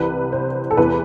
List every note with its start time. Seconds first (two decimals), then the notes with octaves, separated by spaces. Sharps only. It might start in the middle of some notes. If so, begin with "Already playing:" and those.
Already playing: C2 C3 E3 B4
0.32 C5
0.71 A4
0.77 E2 C3 E3 B4